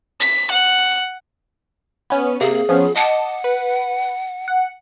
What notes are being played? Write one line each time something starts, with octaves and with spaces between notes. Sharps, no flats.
B6
F#5
B3 C#4 B4
C3 A#3 G#4
F3 B3 C#4
D#5 F#5 A5 D6
B4
F#5